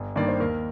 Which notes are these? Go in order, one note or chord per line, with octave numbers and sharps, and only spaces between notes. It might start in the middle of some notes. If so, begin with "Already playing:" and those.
Already playing: G1
G2 D#3 A#3 D5
C5
D#2 A#4